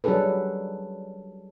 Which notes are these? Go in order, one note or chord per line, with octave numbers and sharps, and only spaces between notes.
F#3 G3 D4 G#4 A4 B4